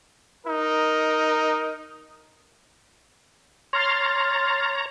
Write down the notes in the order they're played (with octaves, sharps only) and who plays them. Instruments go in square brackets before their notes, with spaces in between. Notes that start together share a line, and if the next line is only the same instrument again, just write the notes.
[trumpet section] D#4 A#4
[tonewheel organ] C#5 A#5 [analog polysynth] C6 F6 A6